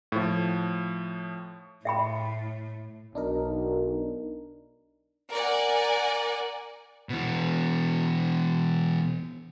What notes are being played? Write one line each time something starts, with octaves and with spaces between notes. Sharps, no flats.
A2 F3
A2 E5 G5 B5
B1 D4 D#4 A#4
A#4 D5 F#5 G#5
B2 E3